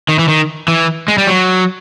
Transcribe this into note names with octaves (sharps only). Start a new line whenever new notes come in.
D#3
E3
D#3
E3
G#3
G3
F#3